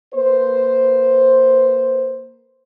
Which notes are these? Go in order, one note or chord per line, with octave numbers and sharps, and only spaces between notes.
A#3 B4 C5